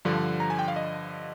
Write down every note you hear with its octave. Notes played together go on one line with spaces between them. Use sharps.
G2 D3 F3
A#5
G#5
G5
F5
D#5